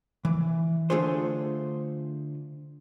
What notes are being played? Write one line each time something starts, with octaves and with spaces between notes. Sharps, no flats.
E3
D3 A3 D4 F4 G#4 C5